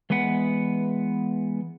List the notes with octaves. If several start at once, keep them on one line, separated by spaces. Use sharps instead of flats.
E3 G#3 B3 B4 F#5